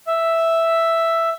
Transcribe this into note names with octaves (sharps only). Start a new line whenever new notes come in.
E5